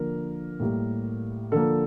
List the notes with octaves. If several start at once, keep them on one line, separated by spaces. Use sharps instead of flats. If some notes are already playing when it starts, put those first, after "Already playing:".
Already playing: D3 F3 A#3 A#4
A2 G3 A#3
D3 F3 A#3 A4